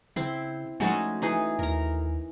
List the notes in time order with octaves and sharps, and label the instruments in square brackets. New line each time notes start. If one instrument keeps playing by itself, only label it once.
[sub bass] C#3 [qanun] C4 E4 C6
[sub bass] F3 [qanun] G#3 C#4 D#4 [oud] A3 F#4
[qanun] E3 D#4 G#4
[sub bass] D#2 [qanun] A#4 A#5